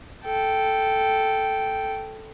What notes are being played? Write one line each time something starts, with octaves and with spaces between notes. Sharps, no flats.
A4 G5